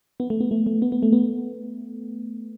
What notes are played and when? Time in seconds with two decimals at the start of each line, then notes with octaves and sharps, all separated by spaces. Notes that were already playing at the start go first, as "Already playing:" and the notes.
0.20 B3
0.30 A3
0.40 B3
0.51 A3
0.66 A3
0.82 B3
0.92 B3
1.03 A3
1.13 B3